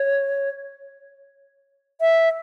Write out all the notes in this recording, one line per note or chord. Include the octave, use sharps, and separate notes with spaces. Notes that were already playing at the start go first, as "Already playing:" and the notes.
Already playing: C#5
E5